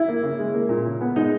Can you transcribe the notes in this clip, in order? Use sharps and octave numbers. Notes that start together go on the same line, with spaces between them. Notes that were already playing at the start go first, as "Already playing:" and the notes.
Already playing: E4
A#3
C#3
G#3
A#3
A#2
C#3
B3
G#3 D#4